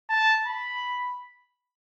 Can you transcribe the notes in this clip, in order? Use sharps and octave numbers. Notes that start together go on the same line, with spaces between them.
A5
B5